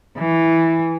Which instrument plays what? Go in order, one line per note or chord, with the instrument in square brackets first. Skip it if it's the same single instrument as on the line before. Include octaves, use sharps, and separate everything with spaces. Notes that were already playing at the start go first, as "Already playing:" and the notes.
[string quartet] E3